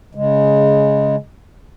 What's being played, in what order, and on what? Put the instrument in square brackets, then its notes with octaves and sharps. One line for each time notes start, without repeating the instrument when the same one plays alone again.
[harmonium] C#3 G#3